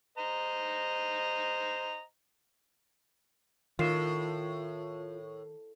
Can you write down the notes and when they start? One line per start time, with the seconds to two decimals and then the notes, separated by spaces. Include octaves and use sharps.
0.18 C5 D#5 A#5
3.79 A2 D#3 F4 A#4 C7 E7